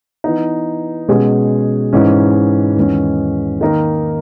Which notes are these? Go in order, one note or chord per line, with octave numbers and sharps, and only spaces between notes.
E3 B3 D#4
B2 G#3 C#4 G#4
G#2 E3 G#3 C#4
E2 D#3 G#3 C#4
D#3 A#3 D#4 A#4